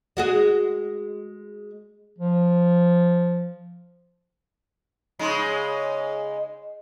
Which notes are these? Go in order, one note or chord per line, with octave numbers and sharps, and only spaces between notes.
G#3 F#4 G#4
F3
C#3 G#3 D#4